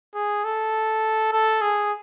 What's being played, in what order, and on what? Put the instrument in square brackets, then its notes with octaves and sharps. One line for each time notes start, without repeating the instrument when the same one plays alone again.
[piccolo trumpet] G#4
A4
A4
G#4